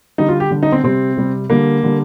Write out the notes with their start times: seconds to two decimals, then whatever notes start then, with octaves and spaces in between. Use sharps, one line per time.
0.18 D3 G3 D#4
0.29 F4
0.40 G4
0.50 D3 G3
0.63 D#4
0.72 C4
0.83 C3 G3 C4
1.17 C3 G3
1.50 D3 G3 A#3
1.83 D3 G3